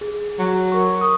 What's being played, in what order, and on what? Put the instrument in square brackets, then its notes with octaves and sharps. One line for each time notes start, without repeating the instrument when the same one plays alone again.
[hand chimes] G#4
[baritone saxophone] F#3
[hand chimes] A#4 C#6
C#6 D#6